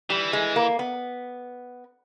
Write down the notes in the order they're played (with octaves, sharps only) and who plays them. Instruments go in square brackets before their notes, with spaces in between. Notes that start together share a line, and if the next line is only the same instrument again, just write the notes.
[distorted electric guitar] E3 [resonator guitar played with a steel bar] G3
[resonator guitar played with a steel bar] G#3
A#3
B3